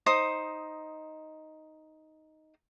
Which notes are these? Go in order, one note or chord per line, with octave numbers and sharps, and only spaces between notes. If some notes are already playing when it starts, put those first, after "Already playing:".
D#4 C5 D#6